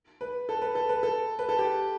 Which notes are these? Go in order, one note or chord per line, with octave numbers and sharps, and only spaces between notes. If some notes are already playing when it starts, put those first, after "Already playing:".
B4
A4
B4
A4
B4
A4
B4
A4
G4